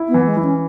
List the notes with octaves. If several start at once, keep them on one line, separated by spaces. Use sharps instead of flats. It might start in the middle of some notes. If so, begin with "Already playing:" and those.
Already playing: E4
B3
E3
G#3
E3
C#4